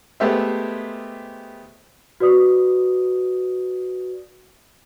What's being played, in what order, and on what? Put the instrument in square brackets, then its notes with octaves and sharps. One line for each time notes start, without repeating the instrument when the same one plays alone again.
[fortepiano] G#3 A3 B3 G4 C5 E5
[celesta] F#4 B4 D5 D#6